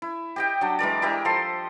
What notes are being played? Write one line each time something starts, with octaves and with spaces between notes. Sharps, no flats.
E4
G4 D#5 G5
F#3 D4
E3 G#3 A#4 D5
E4 G4 A#4 D#5
F3 A4 D#5 C6